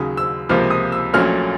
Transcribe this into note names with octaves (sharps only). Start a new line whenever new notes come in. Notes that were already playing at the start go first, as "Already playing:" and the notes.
Already playing: D#2 C#3 F#3 D#6
E6
C#2 C3 F3 A#3 F6
D#6
E6
A#1 A#2 F#3 A3 C#4 F6